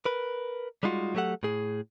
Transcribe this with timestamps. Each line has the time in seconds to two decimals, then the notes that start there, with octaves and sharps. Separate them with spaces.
0.05 A#4 B4
0.83 G3 G#3 D#4 F4 F#4
1.15 F#3 A3 G4 A4 F#5
1.43 A2 G#4